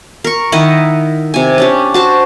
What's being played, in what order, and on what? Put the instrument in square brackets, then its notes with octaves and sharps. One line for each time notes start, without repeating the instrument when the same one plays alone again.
[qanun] A#4 C#6
D#3 E4 D#5 F#5
C3 G#5
C#4 D4 G4
F#4 C5 A5